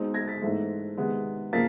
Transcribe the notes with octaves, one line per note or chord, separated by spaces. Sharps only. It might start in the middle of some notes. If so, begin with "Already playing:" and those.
Already playing: B2 G#3 C4 D#4
G#6 A#6
A6 B6
G#2 E3 A3 C4 D#4
C3 D#3 G#3 B3
C#3 F3 A#3 A6 B6